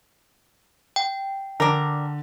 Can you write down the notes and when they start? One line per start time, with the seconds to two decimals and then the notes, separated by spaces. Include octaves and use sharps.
0.96 G5
1.60 D3 D4 A#4